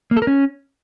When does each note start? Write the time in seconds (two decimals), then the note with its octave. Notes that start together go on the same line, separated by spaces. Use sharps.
0.11 A#3
0.17 A4
0.22 A#4
0.27 C#4